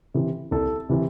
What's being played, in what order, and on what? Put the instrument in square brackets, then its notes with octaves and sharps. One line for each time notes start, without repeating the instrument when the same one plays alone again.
[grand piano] C3 E3
C2 A4
C3 E3